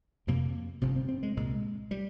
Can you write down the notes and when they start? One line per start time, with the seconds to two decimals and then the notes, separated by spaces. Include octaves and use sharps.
0.27 F1 F2 C3 A#3
0.81 G1 F2 C3 C4
0.96 C4
1.09 C4
1.23 G#3
1.37 C2 A#2 G#3
1.91 G3